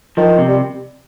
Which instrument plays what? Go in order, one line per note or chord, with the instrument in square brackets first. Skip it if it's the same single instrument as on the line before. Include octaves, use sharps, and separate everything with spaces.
[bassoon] D#3 [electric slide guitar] F3
[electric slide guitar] C3
[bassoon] G3